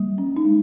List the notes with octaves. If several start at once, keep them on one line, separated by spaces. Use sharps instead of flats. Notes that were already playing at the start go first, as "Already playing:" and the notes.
Already playing: G3 A#3
C#4
D#4
G#3